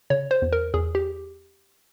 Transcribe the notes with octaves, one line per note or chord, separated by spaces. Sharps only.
C#3 C#5
C5
E2
A#4
E2 G#4
G4